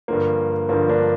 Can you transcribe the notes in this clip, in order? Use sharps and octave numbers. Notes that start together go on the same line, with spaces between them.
G2 D3 F3 A#3
G2 D3 F3 A#3
A#3 D4